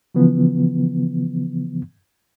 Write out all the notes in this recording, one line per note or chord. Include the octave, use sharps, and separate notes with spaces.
C#3 E3 F3 B3